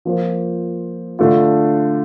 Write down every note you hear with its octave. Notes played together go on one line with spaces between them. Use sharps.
F3 A#3 F4 C5
D3 A3 D4 F4